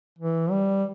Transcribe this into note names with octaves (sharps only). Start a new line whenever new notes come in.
E3
G3